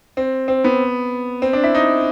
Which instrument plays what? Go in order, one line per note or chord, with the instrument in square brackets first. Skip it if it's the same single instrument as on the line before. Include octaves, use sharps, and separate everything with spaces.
[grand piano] C4
C4
B3
C4
D4
E4
D#4